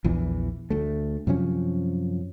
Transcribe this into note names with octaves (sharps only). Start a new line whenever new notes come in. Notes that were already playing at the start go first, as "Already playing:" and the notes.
A#1 E2 E3
D2 A3
F#2 C3 F3 C#4